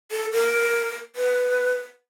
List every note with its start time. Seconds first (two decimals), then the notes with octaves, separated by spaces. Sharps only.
0.11 A4
0.32 A#4
1.16 B4